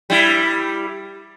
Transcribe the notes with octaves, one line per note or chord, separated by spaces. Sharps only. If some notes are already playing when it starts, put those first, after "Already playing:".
G3 E4